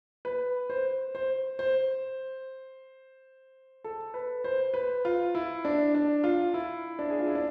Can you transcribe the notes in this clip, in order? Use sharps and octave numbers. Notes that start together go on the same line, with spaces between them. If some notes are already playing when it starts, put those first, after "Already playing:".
B4
C5
C5
C5
A4
B4
C5
B4
F4
E4
D4
D4
F4
E4
D4
G#4
F4
E4
D4